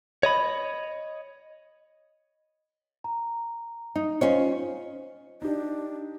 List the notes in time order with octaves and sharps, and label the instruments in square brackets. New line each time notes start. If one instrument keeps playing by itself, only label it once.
[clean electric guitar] C#5 D#5 B5
[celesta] A#5
[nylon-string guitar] D#4
[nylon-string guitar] C#4 F4 C#5 [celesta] C5 D#5
[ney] D4 [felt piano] D#4 G4